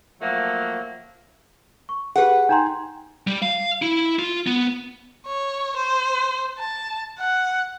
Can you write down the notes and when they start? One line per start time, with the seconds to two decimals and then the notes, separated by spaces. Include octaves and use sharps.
0.21 F3 F#3 A3 A#3
1.89 C#6
2.16 G4 G#4 B4 F#5
2.49 D#4 G5 G#5 A#5 C6
3.27 G3
3.42 F5
3.82 E4
4.19 F4
4.47 B3
5.27 C#5
5.76 C5
6.58 A5
7.18 F#5